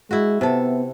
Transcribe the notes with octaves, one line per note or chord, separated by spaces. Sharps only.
G#3 E4 F#4
C3 B3 A4